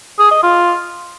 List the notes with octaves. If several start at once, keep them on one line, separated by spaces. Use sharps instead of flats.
G#4
D#5
F4